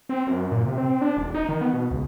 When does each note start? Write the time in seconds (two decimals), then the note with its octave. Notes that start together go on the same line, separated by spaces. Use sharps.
0.09 C4
0.27 F#2
0.51 A#2
0.65 C3
0.78 C4
1.01 D4
1.17 E1
1.35 D#4
1.49 D#3
1.61 B3
1.74 B2
1.91 C#2